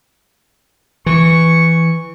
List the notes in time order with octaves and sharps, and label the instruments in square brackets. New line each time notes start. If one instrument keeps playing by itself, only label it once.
[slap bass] E3 [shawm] C#6